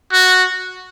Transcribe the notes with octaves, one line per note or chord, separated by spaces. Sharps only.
F#4